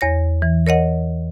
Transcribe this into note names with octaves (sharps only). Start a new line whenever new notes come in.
E2 C#5 A#6
E3
A#4 C#5 D#5 F#5